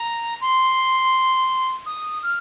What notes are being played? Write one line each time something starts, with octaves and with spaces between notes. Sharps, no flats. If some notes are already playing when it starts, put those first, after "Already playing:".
Already playing: A#5
C6
D#6
F6